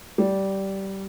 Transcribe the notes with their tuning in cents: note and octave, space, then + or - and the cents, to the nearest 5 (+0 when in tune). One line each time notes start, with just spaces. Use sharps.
G3 -15